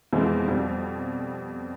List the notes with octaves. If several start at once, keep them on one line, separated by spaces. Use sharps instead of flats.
F2 B2 E3 G#3
F2 B2 G3